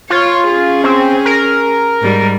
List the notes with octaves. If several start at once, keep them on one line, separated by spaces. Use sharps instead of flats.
F4 C#5
C#4 G#4
C4
A#4
G#2 G3